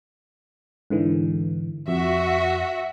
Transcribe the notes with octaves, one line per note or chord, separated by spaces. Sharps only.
G#2 D3 E3
F2 F#4 E5